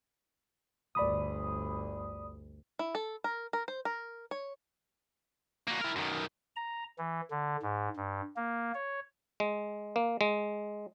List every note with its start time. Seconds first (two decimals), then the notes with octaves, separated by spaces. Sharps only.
0.95 G1 D2 D5 B5 D#6
2.79 E4
2.95 A4
3.24 A#4
3.53 A#4
3.68 C5
3.85 A#4
4.31 C#5
5.68 A#3 F#4
5.81 E4 A#4
5.96 F#2 D#3
6.56 A#5
6.98 E3
7.31 D3
7.62 G#2
7.97 G2
8.36 A#3
8.74 C#5
9.40 G#3
9.96 A#3
10.21 G#3